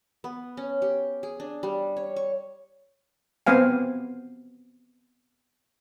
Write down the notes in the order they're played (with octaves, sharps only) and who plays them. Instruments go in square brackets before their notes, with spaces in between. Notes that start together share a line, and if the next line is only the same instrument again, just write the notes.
[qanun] B3
C#4
G4
G#4
D4
G3
C#5
C#6
[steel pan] B3 C4 C5 F5 G#5